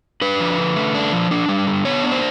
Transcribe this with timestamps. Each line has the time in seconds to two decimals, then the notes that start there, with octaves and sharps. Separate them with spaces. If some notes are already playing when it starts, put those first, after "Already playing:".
0.21 D4 B4
0.40 F3
0.58 D3
0.76 A3
0.95 D4
1.12 F3
1.31 D4
1.49 G3
1.67 D3
1.85 B3 C#5
2.03 D4
2.12 C5